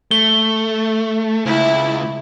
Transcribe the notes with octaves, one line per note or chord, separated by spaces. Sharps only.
A3 G7
C#2 E4